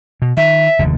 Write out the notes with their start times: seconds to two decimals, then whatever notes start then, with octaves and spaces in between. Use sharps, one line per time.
0.22 B2
0.37 D#3 E5
0.79 F1 D#2 D3